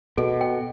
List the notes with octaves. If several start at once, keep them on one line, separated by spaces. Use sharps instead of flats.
B2 A4
G5